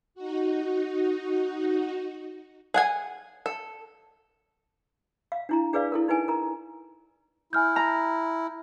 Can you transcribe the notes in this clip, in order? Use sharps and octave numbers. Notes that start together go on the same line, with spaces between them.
D#4 F#4
G#4 F#5 G#5
A4
F5
D4 E4 A#5
D4 G#4 B4 D5 F5
E4 A4 A#4
D#4 E4 B4 G#5
A#4 A#5
E4 G#5 F6 G6
A#5